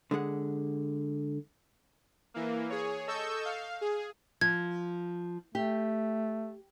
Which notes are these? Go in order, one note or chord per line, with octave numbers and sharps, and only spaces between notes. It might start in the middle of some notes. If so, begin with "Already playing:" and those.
D3 G#3 G#4 F#5
E3 A#3
G#4 C#5
A4 D#5 C#6 E6 G6
F5
G#4
F3 G#6
A3 G4